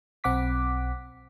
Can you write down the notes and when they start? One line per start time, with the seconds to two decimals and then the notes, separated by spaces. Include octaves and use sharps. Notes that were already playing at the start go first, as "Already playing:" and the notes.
0.24 B1 C4 F#5 D6 B6